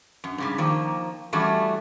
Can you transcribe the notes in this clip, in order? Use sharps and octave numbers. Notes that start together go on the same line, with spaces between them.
F#2
G#2 C#3 G3
D#3 F3 A#3
E3 G3 A3 C#4 F#4